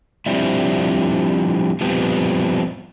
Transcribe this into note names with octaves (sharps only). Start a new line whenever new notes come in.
F3 G3 C4 D4 E4
F3 G3 B3 C4